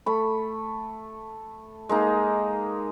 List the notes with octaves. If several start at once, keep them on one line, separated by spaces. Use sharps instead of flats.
A3 B5
G#3 A#3 D#4